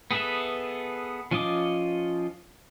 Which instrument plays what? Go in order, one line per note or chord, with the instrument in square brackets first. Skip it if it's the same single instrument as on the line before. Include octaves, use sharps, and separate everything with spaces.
[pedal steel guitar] B3 G#4 A4 B4 E5
F3 C#4 F4 D#5 D6